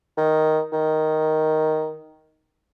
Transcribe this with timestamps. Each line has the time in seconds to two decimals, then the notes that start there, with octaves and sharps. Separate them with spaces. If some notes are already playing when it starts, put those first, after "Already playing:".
0.17 D#3
0.73 D#3